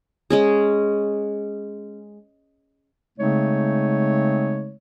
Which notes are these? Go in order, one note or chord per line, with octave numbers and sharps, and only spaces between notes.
G#3 C#4 G#4
C#3 G#3 A3 C4 D#4 C#5